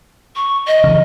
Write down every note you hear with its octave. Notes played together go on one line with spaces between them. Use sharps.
C#6
D#5
C#3 E3